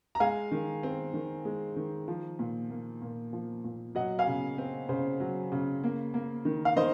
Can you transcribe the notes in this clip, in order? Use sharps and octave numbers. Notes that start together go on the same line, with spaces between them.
A#5
G#3 F5 G#5
D#3
C4
D#3
G#3
D#3
F3
A#2
A#3
A#2
F3
A#2
F#3 D#5 F#5
F5 G#5
C#3
C4
C#3 C5
F#3
C#3
A#3
A#3
D#3
F5
D#3 C5 D#5